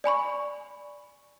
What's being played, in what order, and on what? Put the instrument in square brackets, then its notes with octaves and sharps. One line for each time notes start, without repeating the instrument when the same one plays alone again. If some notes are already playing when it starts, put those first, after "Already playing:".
[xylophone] D5 G#5 B5 C#6